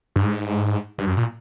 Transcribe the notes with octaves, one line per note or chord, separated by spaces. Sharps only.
G2
G#2
G2
F#2
A#2